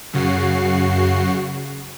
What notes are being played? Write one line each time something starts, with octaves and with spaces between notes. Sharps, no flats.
F#2 C#3 F#4 C7